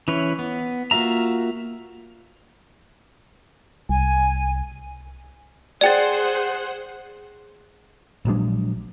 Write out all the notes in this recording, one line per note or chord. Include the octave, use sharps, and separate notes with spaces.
E3 C#4 E4 B4 C#5
B3
A#3 F4 F#4 E5 A#5
C2 G#5
G#4 C5 D5 F#5 G5 A6
A#1 F#3 G#3 D4